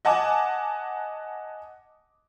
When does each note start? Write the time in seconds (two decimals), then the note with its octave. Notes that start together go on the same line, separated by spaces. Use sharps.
0.05 D#5 F#5 G#5 A5 D6